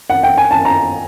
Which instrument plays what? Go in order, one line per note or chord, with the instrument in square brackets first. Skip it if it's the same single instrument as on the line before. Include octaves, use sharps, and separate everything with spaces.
[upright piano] F#5
G5
G#5
A5
A#5